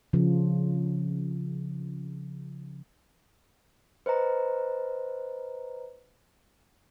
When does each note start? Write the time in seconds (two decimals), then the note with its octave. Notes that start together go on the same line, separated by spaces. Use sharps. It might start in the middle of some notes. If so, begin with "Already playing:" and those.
0.13 C#3 F3
4.06 B4 C5 D#5 A#5